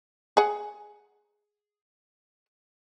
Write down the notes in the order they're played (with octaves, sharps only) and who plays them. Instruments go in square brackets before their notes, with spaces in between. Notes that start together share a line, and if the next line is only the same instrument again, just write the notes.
[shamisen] G#4 F#5